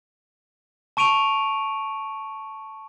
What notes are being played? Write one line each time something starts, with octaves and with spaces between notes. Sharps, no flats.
A5 C#6 D7 D#7 F7